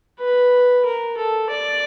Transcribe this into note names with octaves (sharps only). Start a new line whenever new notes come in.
B4
A#4
A4
D5